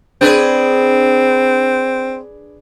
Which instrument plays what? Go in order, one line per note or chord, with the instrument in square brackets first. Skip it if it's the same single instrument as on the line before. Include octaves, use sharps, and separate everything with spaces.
[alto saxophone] C4 [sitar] D4 G#4 B4